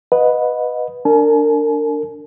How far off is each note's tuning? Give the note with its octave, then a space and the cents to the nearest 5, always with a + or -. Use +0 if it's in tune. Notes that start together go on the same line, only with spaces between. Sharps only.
B4 +0 D#5 +0 F#5 -35
D4 +0 A#4 -30 G#5 +40